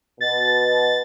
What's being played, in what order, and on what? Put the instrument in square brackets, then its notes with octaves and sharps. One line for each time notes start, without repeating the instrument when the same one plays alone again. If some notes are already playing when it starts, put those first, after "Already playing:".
[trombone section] B2 [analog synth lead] A6